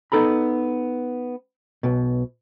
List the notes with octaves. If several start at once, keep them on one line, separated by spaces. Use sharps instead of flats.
B3 D#4 A4 A#5 B5
B1 B2